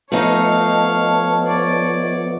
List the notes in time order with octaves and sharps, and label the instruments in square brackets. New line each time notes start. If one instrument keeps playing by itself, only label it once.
[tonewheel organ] F3 B3 [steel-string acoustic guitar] A3 D#4 D#5 [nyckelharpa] C#5 F5 [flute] A5
[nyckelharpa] C#5 D5